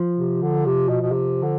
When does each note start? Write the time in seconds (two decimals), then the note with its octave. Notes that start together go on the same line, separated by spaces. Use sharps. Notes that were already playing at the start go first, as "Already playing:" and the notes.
Already playing: F3
0.19 C3
0.42 D3
0.66 C3
0.89 B2
1.01 B2
1.12 C3
1.43 D3